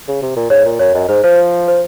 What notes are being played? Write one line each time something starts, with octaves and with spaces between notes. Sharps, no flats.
C#3
C3
A#2
G#2 C#5
A#2
F#2 C#5
F#2 D#5
G#2 C5
F3 C5
C5